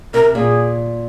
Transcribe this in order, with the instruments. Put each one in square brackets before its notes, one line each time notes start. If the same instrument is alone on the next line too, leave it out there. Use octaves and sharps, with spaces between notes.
[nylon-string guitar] C3 [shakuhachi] A#4
[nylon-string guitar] A#2 [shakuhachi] G#4